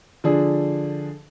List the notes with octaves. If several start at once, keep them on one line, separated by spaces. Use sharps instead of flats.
D3 F3 D4 G#4